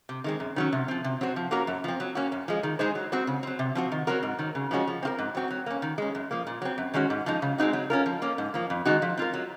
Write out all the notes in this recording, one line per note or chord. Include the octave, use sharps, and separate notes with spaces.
C3
D#3 G#3 C4
F#2
D#3 F#3 C#4
C3
F3 C4
C3
F#3 C4 F#4 C5
F3
A#3 C#4 F#4 A#4
F#2
F3 C4
F#3
A#3 C#4 F#4
F#2
F3 G#3
D#3
G#3 D#4 G#4 C5
F#3
C4 F#4 C5
C#3
F#3 C4
C3
F3 C4 F#4
D#3
F#3 C4 F#4 A#4
G#2
D#3 F#3
C#3
F3 G#3 C#4 F#4
F3
C4 F4 A#4
G#2
F#3 C4 F#4
F#3
A#3 C#4
D#3
G#3 C#4
F#2
F3 A#3
A#2
F#3 C4
F#2
D#3 G#3 C#4 F#4
G#2
F3 G#3 D#4
C#3
G#3 C4 D#4 F#4
F#3
C#4 F4 A#4
F3
A#3 C#4
G#2
F3 A#3
F2
D#3 G#3 D#4 F#4
F3
C4 F4 A#4
F#3